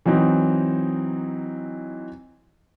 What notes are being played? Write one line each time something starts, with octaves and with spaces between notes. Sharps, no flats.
E3 F#3 C4 D#4